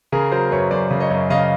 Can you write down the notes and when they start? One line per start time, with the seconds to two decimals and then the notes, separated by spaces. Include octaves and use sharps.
0.12 C#3 G#4 A#4
0.31 F#3 A#4 C5
0.51 F#2 B4 C#5
0.71 F#2 C5 D5
0.91 C#3
1.00 C#5 D#5
1.11 F#2
1.30 C#3 D#5 F5